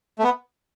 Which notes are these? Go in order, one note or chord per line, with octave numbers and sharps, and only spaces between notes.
A3
B3